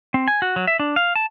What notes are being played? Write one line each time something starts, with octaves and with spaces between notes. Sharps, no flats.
C4
G#5
F#4
F#3
E5
D4
F5
A5